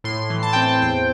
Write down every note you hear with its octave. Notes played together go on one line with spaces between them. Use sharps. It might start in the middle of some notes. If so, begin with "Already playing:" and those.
A2 C6
E3
A5
C4 G5
A5
E2 G5